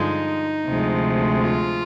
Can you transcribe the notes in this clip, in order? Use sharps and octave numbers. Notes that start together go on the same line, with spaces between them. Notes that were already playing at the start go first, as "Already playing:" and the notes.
Already playing: G2 D3 F3 G#3 D#4
D2 C3 F3 G#3
F4